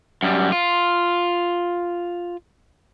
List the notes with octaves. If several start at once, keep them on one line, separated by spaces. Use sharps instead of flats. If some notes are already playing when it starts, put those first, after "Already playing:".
F#2 G3
F4